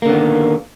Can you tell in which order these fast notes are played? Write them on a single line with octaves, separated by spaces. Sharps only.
A#3 D3 B3 D#3